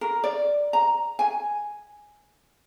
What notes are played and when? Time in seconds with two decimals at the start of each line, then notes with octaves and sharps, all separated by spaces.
0.01 A#4
0.24 D5
0.73 A#5
1.19 G#5